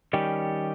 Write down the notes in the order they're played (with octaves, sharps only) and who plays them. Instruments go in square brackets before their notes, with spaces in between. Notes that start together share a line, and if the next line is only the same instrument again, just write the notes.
[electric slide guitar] D#3 G3 C#4 G4